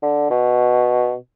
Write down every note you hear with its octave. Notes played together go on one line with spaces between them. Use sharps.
D3
B2